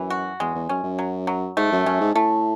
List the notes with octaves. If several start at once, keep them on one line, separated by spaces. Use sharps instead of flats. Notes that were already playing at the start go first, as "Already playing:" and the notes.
Already playing: F#2 E3
F#4
E2 G#3
E2
F#2 C#4
F#2
F#3
F#3
G#2 A3
F#2
F#2 C#4
G#2
A2 A3